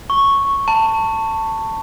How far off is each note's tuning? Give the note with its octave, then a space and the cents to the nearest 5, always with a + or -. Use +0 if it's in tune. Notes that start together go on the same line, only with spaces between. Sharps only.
C#6 -5
A5 +20